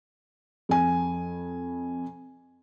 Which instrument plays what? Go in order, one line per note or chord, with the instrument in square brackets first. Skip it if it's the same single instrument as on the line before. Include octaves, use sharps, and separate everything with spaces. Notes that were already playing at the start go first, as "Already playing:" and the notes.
[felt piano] F2 G#5